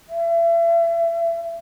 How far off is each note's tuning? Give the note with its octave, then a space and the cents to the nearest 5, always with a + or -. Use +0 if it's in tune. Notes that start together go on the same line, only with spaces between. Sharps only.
E5 +35